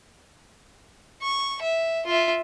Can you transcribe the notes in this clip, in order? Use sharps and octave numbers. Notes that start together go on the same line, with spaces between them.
C#6
E5
F4 E5